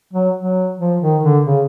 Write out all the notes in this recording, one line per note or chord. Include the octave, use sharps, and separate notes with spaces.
F#3
F#3
F3
D#3
D3
C#3